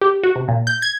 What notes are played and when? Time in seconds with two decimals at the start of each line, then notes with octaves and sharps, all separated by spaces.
0.01 G4
0.23 F#4
0.36 C3
0.48 A#2
0.67 G6
0.82 G#6